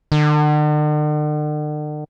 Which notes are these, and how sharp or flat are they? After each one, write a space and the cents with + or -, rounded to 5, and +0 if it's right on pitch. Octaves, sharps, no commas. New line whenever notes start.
D3 +45